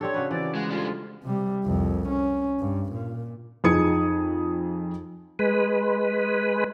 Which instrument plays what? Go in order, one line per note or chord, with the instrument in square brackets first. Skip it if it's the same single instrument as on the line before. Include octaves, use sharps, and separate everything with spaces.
[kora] C4 G4 A4 [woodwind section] D4 C#5
[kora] C#3 F#4 B4
[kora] E3 [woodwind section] C4 D5
[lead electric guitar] G#3 [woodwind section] F4 F#5
[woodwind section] F2 D4 F4 [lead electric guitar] G3 G#3
[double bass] C3 G3
C2 F2
C#4
G2
A#2
[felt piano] F2 D#4 G#4 D#6 G#6 C#7
[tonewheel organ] G#3 B4